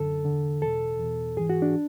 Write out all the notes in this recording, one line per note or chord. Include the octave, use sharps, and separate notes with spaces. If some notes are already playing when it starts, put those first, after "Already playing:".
Already playing: F#2 D3 A4
E2 D3
E2 B2 A4
E2 B2
G#2 E3 G#4
F#4
D4